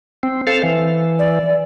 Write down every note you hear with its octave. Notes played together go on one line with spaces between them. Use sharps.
C4
A4 C5 F5
E3
D5